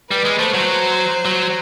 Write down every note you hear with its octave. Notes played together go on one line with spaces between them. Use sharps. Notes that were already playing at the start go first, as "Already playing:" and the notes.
G3 B4
G#3
A3 C5
F#3
F#3